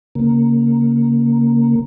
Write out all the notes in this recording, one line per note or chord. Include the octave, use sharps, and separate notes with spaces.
C#3 A#3